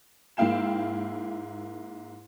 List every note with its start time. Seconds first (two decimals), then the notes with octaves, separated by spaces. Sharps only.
0.37 G#2 A#3 E4 F5 G5 E7